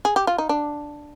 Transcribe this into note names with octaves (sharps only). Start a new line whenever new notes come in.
G#4
G4
F4
D#4
D4